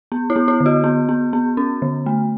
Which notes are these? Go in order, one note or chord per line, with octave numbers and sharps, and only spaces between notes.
B3
E4
B3
E4
D3
F#4
B3
B3
B3
C#4
D3
A3